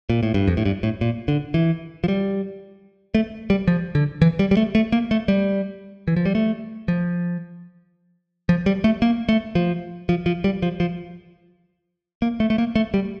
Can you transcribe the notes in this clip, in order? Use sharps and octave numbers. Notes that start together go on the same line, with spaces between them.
A#2
A2
G2
F2
A2
G2
A2
A#2
D3
E3
F3
G3
A3
G3
F3
D3
E3
G3
G3
A3
A3
A#3
A3
G3
E3
F3
G3
A3
F3
F3
G3
A3
A#3
A3
F3
F3
F3
G3
F3
F3
A#3
A3
A3
A#3
A3
G3